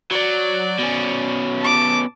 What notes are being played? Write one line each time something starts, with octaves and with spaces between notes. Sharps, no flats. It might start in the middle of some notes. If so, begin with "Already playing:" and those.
F#3 D5
B2 C#4
A5 D6